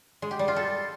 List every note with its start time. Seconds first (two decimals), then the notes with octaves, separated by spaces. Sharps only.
0.22 G#3
0.31 G4
0.39 G3
0.48 F4
0.56 A4